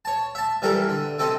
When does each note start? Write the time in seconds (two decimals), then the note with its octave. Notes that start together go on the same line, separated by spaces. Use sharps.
0.05 C#5 A5
0.35 E5 A5
0.62 E3 G3 E4 A4 A#4
0.89 D3
1.19 C3 C4 A4 D#5